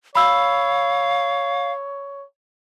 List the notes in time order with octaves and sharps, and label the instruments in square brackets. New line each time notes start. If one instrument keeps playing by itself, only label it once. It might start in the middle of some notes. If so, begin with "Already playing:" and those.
[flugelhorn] C#5 [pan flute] F5 [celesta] B5 E6